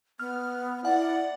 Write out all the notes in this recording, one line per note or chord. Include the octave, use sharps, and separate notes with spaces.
B3 F6
E4 D5 F#5